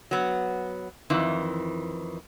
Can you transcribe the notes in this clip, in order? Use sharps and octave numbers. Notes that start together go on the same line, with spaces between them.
F#3 B3
F2 D#3 E3